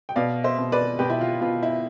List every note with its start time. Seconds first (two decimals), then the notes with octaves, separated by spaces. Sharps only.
0.09 G5
0.16 B2 D5 F5
0.44 C5 E5
0.58 B2
0.72 B4 D5
0.99 B2 G4 B4
1.10 E4
1.21 F4
1.41 B2 F4
1.63 E4